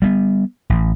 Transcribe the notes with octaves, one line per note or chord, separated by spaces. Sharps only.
G3 A#3 B3
A1